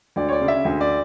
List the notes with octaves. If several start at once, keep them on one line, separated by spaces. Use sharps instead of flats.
D2 D5
C#5
D5
C#3
E5
D2
D5